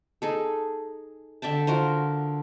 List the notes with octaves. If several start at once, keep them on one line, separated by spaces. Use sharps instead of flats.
D#4 G#4 A4
D3 E5 G5 A5
F4 F#4 A#4 C5